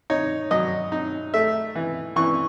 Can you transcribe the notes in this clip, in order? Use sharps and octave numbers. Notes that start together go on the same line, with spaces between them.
D#4 C#5
F#3 D#5
D#4
A3 E5
E3
E3 C#6